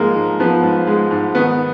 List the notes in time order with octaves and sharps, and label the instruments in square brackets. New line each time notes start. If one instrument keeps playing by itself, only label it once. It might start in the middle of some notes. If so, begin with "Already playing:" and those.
Already playing: [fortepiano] G#2 F3 G#3 A#3
G#2
F3 B3
G#2
G#3
G#2
D#3 B3